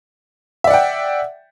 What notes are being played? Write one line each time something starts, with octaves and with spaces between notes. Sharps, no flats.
D5 E5 F#5 G5